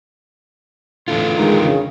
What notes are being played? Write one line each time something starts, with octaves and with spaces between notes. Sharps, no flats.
E2 A2 D3 F4
D#3 G#3
C#3